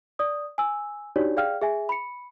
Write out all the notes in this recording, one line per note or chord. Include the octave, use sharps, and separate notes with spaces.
D5 D#6
G#5 E6
D4 D#4 F#4 G4 C#5 D5
G#4 D5 F5 G5 F6
G#4 E5 G#5
B5 C#7